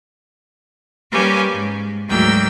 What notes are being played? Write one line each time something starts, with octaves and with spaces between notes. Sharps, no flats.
G3 A#3 C#4 G4 B4 G#5
G#2
D2 G#2 F#3 A#3 G5 E6